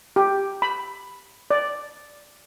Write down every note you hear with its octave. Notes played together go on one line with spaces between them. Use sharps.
G4
B5
D5